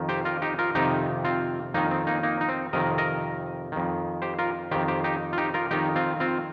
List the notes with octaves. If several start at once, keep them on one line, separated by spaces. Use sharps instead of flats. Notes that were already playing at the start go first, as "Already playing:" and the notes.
Already playing: F2 D#3
G4 C5
F4 A#4
D#4 G4
F4 A#4
F2 C3 D#3 D#4 G4
C4 F4
F2 D#3 A#3 D#4
C4
A#3 D#4
A#3 D#4
D#4
C4
F2 C3 D#3 A#4 D#5
A#4 D#5
F2 D#3
G4 C5
F4 A#4
F2 D#3 G4 C5
G4 C5
D#4 G4
F4
D#4 G4
F4 A#4
F2 D#3 D#4 G4
C4 F4
C4 F4